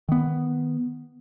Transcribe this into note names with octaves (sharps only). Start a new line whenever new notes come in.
D#3 B3